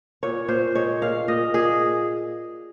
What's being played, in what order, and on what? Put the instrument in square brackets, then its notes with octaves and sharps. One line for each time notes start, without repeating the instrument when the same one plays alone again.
[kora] A#2 C#5
A#2 C5
G#3 C#5
A#2 F5
A#2 D#5
A#2 G#4